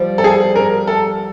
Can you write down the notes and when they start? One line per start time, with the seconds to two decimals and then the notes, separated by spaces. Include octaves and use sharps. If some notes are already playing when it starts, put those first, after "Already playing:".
Already playing: F3 G3
0.18 A4
0.24 G#4
0.56 A#4
0.87 A4